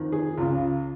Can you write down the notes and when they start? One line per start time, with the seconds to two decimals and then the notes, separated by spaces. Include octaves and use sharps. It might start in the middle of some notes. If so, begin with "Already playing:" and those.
Already playing: F2 D#3
0.12 G#4
0.37 C#2 C#3 F4